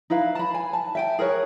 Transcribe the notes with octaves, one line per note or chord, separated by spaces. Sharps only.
D#4 E4 B4 F5
A5 B5
G#5
A5
E5 G5 G#5
G#4 A#4 B4 C#5